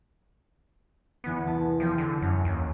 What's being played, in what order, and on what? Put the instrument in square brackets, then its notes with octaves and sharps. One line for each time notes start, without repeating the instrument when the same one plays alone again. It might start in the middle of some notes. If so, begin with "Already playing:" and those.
[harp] E2 E3 D#6 [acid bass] B3
[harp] C2 A5
[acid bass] F3 [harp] G5 D#6
[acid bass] D3
[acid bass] F#2 [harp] C#4
[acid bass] D#2